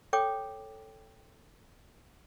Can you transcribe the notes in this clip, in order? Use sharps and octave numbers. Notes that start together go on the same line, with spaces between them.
A4 C#5 G5 D6 D#6